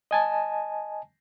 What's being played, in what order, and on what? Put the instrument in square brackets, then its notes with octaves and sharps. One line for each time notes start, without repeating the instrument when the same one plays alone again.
[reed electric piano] D#5 G#5 A5